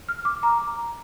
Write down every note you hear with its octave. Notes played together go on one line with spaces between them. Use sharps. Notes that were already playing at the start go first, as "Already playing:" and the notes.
F6
D6
A#5